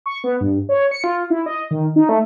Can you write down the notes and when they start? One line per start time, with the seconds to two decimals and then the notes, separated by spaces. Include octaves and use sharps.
0.06 C#6
0.24 B3
0.41 G2
0.69 C#5
0.91 C#7
1.04 F4
1.30 E4
1.46 D#5
1.71 D#3
1.96 D#4
2.09 A3